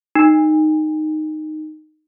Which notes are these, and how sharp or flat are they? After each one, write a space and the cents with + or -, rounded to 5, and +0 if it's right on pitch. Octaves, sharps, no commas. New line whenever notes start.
D#4 -10